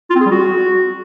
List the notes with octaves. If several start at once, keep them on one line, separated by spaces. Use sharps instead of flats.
F4
C4
G#4
G3
F#4